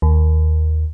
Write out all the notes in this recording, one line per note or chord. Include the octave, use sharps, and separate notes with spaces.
D#2